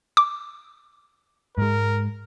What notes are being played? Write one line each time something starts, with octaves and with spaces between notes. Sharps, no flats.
D6
G#2 G#3 A#4